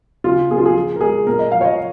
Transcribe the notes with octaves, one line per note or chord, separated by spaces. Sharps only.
C#3 F4
A#3 G#4
F4
G#4
F3
A#4
G#3 G#4
A#2 A#4
D#5
F3 F5
C#5
D#5